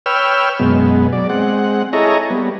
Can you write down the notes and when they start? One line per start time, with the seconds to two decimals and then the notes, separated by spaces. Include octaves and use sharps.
0.06 B4 C#5 G5 E6 F6
0.59 F#2 B2 G#3 B3
1.12 F#3 D5
1.29 G#3 C4 F#5
1.93 E4 G#4 A4 C#5 D#5 A#5
2.30 G3 B3